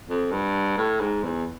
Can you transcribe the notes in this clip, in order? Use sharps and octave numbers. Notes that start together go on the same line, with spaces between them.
F2
G2
A2
G#2
E2